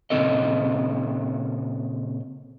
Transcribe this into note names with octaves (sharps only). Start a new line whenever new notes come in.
A#2 C#3 C4 C#4 A4 D#5